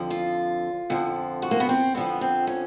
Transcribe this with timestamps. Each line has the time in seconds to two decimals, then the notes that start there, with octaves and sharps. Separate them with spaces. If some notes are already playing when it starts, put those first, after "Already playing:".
Already playing: F2 D3 F3
0.10 F4
0.90 F2 D3 F3
1.42 F#4
1.51 A#3
1.60 B3
1.69 C4
1.94 F2 D3 F3 B3
2.21 C4
2.47 C#4